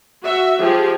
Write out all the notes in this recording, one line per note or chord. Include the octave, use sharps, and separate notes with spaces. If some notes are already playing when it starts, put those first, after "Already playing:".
F#4 E5
F3 G4 G#4